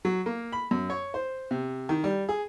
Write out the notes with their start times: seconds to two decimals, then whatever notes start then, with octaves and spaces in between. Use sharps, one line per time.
0.05 F#3
0.26 A#3
0.52 B5
0.71 F#2
0.90 C#5
1.14 C5
1.51 C3
1.89 D#3
2.04 G3
2.29 G#4